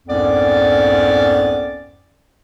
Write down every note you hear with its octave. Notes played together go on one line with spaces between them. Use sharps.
C2 F2 G#2 B3 C#4 D5